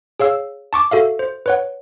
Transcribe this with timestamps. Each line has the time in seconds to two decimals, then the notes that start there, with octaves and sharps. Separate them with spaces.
0.20 G#4 C#5 F5 E6
0.73 A5 C#6 D6
0.91 F#4 A4 E5 F5
1.19 C5
1.46 B4 C#5 F#5